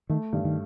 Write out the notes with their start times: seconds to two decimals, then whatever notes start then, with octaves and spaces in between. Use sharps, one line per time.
0.10 D#3 A3
0.33 G2 D#3
0.45 D#3